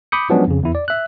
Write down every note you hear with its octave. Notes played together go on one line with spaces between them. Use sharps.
B5 D6 D#6 G6 C#7
F3 F#3 G#3 B3 C#4 D4
F2 C#3
E2 E4
D5
E5 F#6